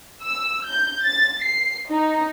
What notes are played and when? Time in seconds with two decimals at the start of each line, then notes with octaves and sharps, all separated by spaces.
0.24 E6
0.67 G6
1.03 A6
1.44 C7
1.91 D#4